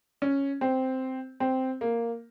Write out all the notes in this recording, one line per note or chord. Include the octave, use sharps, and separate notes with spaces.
C#4
C4
C4
A#3